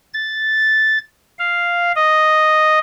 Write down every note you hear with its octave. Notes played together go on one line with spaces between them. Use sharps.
A6
F5
D#5